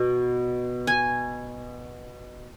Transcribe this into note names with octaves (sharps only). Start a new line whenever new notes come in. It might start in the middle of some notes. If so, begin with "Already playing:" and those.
Already playing: B2
G#5